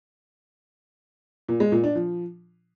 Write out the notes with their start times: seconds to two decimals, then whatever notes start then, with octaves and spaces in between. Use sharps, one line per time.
1.49 A#2
1.60 G#3
1.72 A#2
1.84 D4
1.95 F3